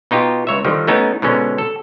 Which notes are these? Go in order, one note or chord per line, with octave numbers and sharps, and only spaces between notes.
B2 D#4 F4 G4
C#2 C#5 E5
D3 D#3 F3 G3
A3 B3 C#4 D#4 E4
G#2 B2 D3 C#4
A4